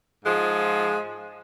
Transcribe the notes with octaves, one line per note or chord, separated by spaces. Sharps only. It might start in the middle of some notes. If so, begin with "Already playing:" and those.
G#2 F3 G#3